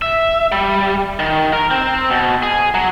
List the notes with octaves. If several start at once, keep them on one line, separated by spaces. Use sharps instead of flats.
E5
G3
D#3
A#4
C4
B2
G#4
F#3